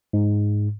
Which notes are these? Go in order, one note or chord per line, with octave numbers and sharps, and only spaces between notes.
G#2